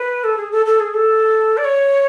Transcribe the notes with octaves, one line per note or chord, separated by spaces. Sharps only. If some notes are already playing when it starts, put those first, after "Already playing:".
Already playing: B4
A4
G#4
A4
A4
G#4
A4
D5
C#5